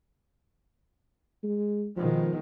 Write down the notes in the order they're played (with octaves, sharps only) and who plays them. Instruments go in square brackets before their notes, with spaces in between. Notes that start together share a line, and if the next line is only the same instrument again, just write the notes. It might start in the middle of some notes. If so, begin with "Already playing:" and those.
[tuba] G#3
[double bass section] B2 D#3 G#3 [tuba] F3